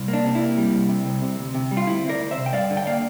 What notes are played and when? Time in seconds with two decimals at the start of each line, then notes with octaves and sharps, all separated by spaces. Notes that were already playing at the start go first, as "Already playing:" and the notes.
Already playing: C2
0.08 A#3
0.13 D4
0.25 C3
0.35 E4
0.40 A#3
0.57 G3
0.73 C2
0.89 C3
1.06 C2
1.22 C3
1.39 D2
1.55 C3
1.71 G3
1.77 F4
1.87 D2 E4
2.05 C4 A#4 D5
2.20 D2
2.31 C5 E5
2.38 C3
2.46 G5
2.53 G2 D5 F5
2.70 D3
2.77 G5
2.86 A#3 D5 F5